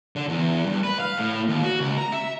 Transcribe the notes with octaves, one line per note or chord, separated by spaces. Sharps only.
D3
E2
G2
B4
F5
A2
D#2
F#4
C#2
A#5
E5